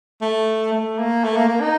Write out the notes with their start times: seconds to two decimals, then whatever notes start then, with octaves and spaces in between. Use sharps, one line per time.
0.22 A3
0.73 A3
0.99 A#3
1.24 A3
1.36 A#3
1.49 A#3
1.61 D#4